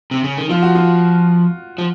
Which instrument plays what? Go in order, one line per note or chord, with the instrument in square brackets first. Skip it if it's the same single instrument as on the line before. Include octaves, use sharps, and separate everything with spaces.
[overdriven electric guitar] C3
C#3
D#3
[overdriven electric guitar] F3 [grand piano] F4
[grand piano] F#4
F4
[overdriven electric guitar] F3